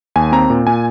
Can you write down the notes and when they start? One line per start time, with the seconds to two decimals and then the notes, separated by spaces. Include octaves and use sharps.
0.16 D#2 G#5
0.32 C4 A#5
0.50 A#2
0.67 A#2 G#5